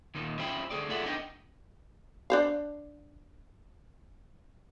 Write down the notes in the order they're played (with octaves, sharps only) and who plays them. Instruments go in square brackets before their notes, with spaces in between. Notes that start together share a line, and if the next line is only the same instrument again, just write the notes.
[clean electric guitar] D#2 A#2 D#3
C#4 F4 C5 E5 G5 B5
D2 A3 G#4 D5
F4 G#4 A4 D5 E5 F#5
B3 D4 D#4 D#5 G5
[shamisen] D4 C5 F5